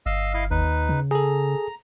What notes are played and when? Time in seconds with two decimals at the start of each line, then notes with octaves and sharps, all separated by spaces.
0.06 G1 D#5 F5 E6
0.34 E4 D#5 F5
0.51 D#2 D#4 B4
0.89 C#3
1.11 G#4 A4 A#5